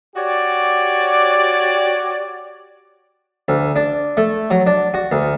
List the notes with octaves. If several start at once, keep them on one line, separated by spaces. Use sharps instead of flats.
F#4 G4 C#5 D5
D2
D4
A3
F#3
D4
F#4
D2